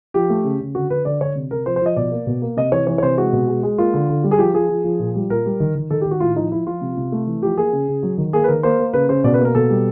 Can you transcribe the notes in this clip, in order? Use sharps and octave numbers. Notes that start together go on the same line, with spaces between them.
F3 G4
A3
C#3
C#3
D3 F#4
D3 B4
D3 D5
D3 C#5
C3
C3 A#4
F3 C5
C5
F3 D#5
B2 D5
A#3
B2
A#3
C3 D#5
E3 C#5
E3 C#5
C#5
C3 C5
G#3 F#4
B2
G#3
G#3
A#3 F4
D3
D3
G3
G#4
F3 G4
F3 G#4
F3
F3
A#2
G3
A#2 A#4
G3
D#3
D#3
D#3 A4
G4
D#3
F#4
A2 F4
F3 D#4
F3 E4
F3 F4
C3
C3
A3
E3
F3 G4
A#3 G#4
C#3
C#3
F#3
D#3
A#3 G#4
B4
D#3 A#4
A#3 C5
A#3
C#3 B4
C#3 C5
B2 D5
B4
A#3
A#4
B2 A4
G3